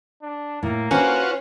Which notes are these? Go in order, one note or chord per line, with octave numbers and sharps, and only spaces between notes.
D4
A2 A#3
C#4 F4 F#4 B4 C5